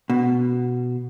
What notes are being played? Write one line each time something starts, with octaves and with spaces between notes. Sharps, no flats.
B2